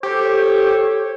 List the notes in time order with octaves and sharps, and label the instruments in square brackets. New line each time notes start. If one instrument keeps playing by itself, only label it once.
[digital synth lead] G4 [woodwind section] A4 C5 C#5